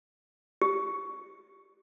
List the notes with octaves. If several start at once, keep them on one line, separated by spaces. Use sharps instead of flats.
G4